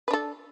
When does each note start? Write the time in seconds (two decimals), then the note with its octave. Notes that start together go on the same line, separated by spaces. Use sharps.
0.08 B4
0.11 D4
0.13 A4